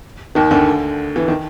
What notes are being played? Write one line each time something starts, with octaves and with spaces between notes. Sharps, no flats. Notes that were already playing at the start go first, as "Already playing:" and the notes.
D#2 D#3
D2 D3
E3
D#3